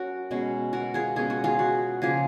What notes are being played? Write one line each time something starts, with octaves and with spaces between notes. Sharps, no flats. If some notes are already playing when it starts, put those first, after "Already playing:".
Already playing: F#3 C#4 F#4 A#4
B2 G#3 C#4
F#4 A#4
F4 G#4
B2 G#3 C#4 G#4
F#4
F4 G#4
F#4
C#3 F3 A#3 F4 G#4